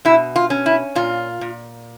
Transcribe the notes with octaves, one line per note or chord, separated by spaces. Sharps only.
B2 E4
F4
C#4
E4
A#2 F4
A#2